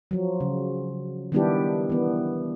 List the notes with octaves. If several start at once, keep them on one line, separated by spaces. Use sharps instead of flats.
F3 F#3
C#3
D#3 G3 B3 D4 E4 G4
E3 B3